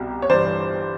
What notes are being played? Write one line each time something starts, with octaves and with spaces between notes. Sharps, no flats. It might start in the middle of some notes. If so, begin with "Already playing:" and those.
Already playing: C2 B2 G3
C#5
G1 G2 E3 C5 D5